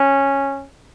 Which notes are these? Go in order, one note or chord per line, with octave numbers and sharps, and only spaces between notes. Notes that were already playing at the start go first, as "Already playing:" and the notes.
Already playing: C#4